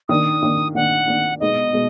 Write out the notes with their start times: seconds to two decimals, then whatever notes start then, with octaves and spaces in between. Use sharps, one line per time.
0.09 D#3 A#3 D4 D#6
0.43 D#3 A#3 D4
0.75 D#3 A#3 D4 F#5
1.08 D#3 A#3 D4
1.40 B2 G#3 B3 D#4 D#5
1.73 B2 G#3